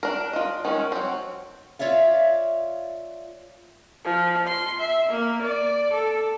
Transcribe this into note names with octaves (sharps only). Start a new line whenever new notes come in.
D4 A#4
F4 D#5
D#3 G#3 C#4
F#3 C4
F4 C#5 D5 E5 F5
F3
C6
E5
A#3
D5
A4